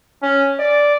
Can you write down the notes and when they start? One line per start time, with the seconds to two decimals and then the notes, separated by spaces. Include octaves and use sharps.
0.22 C#4
0.59 D5